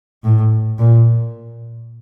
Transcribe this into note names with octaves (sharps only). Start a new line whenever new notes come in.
A2
A#2